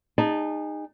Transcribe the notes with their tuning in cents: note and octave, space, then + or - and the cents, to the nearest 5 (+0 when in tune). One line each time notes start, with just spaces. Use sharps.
D#4 -15 G#4 -30 A5 +0